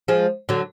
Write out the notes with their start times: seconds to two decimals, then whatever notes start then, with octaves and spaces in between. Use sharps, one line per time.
0.08 F3 G#3
0.49 D3 F#3